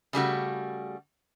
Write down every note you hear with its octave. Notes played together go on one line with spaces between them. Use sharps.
C#3 G3 A3 F#4